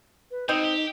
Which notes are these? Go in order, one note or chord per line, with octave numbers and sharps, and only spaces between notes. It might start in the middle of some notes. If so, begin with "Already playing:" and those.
B4
B2 C4 D#4 D#5
G4